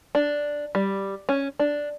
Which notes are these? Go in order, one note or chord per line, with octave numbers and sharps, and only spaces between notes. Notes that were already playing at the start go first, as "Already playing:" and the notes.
D4
G3
C#4
D4